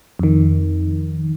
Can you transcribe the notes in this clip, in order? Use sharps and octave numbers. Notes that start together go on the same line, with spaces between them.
F2 D#3